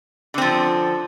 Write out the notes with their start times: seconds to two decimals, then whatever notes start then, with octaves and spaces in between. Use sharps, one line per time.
0.34 D3
0.38 C4
0.42 F3